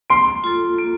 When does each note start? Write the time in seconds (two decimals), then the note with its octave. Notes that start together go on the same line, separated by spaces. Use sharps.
0.10 A#3 C6
0.44 F4 A4
0.78 A#3